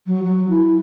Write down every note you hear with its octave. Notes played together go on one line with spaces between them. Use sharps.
F#3
F#3
E4